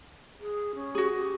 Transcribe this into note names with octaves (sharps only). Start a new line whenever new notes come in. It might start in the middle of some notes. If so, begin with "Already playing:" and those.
G#4
C#4
F#4 G#4
G4